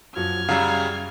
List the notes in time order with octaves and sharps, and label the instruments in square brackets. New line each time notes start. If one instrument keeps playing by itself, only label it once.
[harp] F#2 [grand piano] F3 F#3 [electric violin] F6 G#6
[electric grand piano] C#3 G3 [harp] E4 F#4 D5 [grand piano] F5 A#5 E6